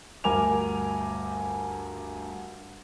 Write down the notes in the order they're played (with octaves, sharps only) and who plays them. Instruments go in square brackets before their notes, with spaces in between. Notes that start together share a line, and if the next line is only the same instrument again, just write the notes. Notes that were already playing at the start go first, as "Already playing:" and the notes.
[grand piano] D2 G2 A#4 G#5 D6 F7